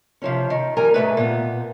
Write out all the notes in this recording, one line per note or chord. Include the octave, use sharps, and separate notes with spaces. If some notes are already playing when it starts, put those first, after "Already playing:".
C3 F3 C#4
D#3
F3 G3 A#4 G#5 A#5
G#2 F#3 A3 B4
A#2 B3